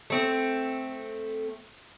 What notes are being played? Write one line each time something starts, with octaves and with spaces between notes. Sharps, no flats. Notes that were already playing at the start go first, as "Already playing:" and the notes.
A3 C4